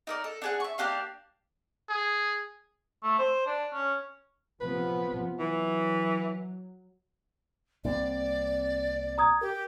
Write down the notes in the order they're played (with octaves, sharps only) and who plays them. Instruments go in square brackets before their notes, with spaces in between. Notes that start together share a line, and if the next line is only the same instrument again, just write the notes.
[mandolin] D#4 A#4 D5
A4
D4 G#4 F#5
E5 C#6
A#3 D4 G4 F5
[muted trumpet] G#4
[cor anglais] A3
C5
D4
C#4
[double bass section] C3 F3 B3 [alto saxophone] B4
[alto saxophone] E3 [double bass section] F#3
[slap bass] C2 A#3 C4 [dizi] D5
[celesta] A#5 D#6 G#6
[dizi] G4 [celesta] A#4